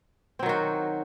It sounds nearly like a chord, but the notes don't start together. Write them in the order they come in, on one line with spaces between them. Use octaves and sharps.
C4 F#3 D#3 F#4